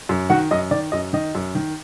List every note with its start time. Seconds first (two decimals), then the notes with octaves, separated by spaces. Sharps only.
0.09 F#2
0.30 D#3 F#4 F#5
0.51 F#2 D#5
0.71 D#3 D5
0.92 F#2 D#5
1.13 D#3 D#5
1.35 F#2
1.55 D#3